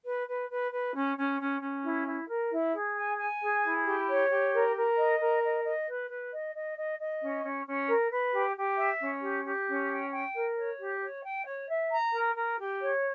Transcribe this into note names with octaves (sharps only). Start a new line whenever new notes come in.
B4
B4
B4
B4
C#4
C#4
C#4
C#4
E4
E4
A#4
E4
G#4
G#5
G#5
G#4
E4
G4
C#5
G4
A#4
A#4
D#5
A#4
D#5
D#5
B4
B4
D#5
D#5
D#5
D#5
C#4
C#4
C#4
A#4
B4
G4
G4
E5
C#4
G4
G4
C#4
G5
G5
A#4
C#5
G4
C#5
G5
C#5
E5
A#5
A#4
A#4
G4
C#5